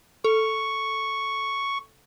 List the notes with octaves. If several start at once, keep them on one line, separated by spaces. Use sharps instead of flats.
A4 C#6